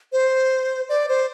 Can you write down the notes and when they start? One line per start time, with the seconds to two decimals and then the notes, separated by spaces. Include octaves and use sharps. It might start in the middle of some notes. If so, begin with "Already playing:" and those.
0.12 C5
0.89 D5
1.09 C5